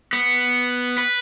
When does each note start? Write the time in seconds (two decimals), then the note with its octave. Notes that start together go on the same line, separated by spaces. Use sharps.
0.13 B3
0.98 B4